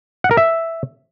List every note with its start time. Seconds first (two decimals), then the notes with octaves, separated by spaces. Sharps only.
0.24 F#5
0.31 A#4
0.37 E5